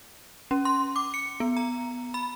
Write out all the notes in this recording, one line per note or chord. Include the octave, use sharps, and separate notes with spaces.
C#4
C6
D6
C#7
B3
A#5
B5